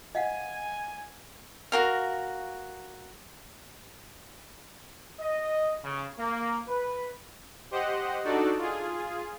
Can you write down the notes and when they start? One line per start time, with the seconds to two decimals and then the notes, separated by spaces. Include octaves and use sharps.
0.15 D#5 F5 F#5 G#5
1.72 F#4 A#4 F5
5.20 D#5
5.84 C#3
6.19 A#3
6.68 B4
7.71 G4 C5 D#5 F#5
8.25 D4 D#4 F#4 A4 D5
8.58 F4 G#4